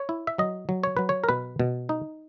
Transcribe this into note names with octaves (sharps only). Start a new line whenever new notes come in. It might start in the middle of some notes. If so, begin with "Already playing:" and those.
Already playing: C#5
E4
E5
F#3 D#5
F#3
C#5
F#3 B4
C#5
A#4
B2 B4
B2
D#4